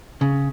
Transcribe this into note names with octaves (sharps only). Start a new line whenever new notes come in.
C#3